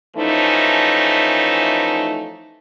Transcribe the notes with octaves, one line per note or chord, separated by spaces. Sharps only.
E3 F3 A3 C#4 D#4